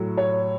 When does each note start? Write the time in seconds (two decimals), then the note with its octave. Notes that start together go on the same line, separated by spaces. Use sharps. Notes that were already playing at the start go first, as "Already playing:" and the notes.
Already playing: A2 F#3 A3
0.17 C#5